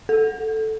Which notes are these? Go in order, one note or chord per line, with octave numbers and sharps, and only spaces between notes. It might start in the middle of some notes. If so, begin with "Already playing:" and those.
A4